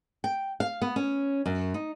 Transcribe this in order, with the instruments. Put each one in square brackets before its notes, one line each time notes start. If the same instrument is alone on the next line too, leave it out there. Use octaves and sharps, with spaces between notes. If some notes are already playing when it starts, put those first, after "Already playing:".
[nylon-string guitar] G5
F5
B3
C#4
F#2
D#4